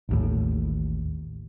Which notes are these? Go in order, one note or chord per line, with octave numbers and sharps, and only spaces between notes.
A1 D#2 A2